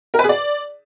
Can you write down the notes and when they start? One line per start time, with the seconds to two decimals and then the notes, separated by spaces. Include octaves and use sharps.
0.14 A#4
0.19 B4
0.24 G#4
0.29 D5